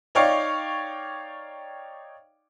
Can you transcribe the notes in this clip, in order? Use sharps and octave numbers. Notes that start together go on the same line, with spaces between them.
D#4 C#5 D5 F5 G5 C#6